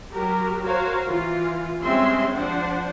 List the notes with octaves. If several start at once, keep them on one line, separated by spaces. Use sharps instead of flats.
F#3 F#4 G4 A#4
F#4 A#4 C5 C#5 F5
E3 F4
G3 G#3 C4 C#4 E5 C6
F3 D4 C5 F#5